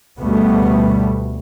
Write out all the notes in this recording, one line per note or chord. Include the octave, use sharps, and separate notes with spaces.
D2 B2 G3 A3 B3